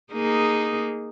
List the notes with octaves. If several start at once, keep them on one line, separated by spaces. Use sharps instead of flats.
A#3 D#4 G#4